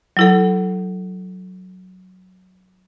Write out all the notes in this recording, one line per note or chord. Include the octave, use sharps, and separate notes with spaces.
F#3 E4 A4